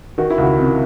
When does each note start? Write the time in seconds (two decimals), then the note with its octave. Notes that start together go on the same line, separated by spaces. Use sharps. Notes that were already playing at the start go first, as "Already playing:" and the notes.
0.18 D#3 F#4
0.30 E4
0.38 C#2 F#4
0.59 C3